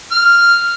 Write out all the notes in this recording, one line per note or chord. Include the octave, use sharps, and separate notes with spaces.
F6